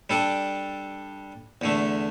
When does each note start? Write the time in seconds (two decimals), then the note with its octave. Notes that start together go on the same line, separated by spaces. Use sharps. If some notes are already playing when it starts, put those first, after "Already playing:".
0.10 G3 D4 A4 D5
1.61 E2 D3 A3